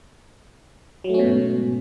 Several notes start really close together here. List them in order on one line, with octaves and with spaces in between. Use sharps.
F#3 A3 C#4 B2 G#2